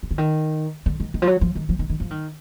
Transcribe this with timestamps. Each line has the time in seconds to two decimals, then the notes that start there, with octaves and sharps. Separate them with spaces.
0.03 D#3
0.11 D3
0.18 D#3
0.86 D3
1.00 D#3
1.14 D#3
1.22 F3
1.27 F#3
1.41 F3
1.55 D#3
1.69 F3
1.79 D#3
1.90 D#3
2.00 F3
2.11 D#3